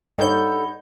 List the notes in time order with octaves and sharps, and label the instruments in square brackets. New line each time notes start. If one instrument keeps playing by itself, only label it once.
[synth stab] G2 G6 [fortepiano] D#4 C#5 [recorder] A4 [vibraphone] D5 F#5 B5